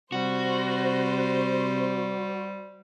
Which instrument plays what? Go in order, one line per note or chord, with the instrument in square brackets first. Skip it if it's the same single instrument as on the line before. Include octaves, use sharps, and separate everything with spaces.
[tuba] C3 [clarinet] G3 [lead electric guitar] F#4 [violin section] C5